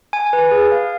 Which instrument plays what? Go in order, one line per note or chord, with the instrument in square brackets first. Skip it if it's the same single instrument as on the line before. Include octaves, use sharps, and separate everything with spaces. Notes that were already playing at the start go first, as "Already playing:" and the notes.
[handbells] G#5
B4
G#4
F5